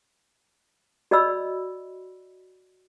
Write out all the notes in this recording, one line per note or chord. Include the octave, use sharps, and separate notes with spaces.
F#4 D5 D#5 B5 E6